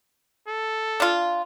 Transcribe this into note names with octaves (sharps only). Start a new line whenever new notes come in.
A4
D4 F4